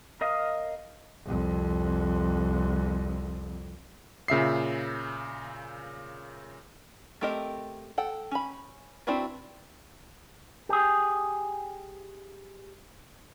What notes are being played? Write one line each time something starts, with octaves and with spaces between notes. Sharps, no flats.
A#4 D#5 F5 D#6
C2 F2
A#2 C#3 E5 C7
A3 C4 G4 A#4 D#5
A4 F#5 G5
C#4 B5
C4 D4 E4 F#4 B4
G4 G#4